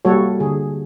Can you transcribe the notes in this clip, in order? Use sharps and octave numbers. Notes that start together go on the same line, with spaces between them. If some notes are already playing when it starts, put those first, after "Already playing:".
G3 A#3 F#4 A4 C#5
D3 G#4